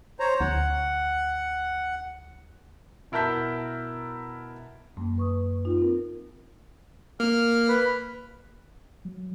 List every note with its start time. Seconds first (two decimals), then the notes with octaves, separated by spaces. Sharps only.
0.20 C5 C#5 A#5
0.41 D2 F#5
3.12 B2 E4 A#4 A5 G6 B6
4.97 F#2 A#3
5.18 B4 C#6 D#6
5.65 D#4 F4
5.78 C4 A#4
7.20 A#3 F6
7.68 B4
9.05 F#3